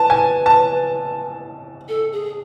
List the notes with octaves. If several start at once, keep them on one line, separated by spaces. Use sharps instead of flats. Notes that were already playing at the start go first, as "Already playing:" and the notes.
Already playing: B4 A5
G#5
A5
A4
G#4